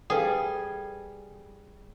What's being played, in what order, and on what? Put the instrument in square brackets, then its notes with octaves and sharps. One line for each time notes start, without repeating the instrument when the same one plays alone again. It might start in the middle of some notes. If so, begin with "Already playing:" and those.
[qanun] G3 [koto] G#4 [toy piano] A4 B4 F5